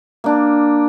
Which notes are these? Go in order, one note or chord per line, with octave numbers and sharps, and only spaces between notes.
A#3 D4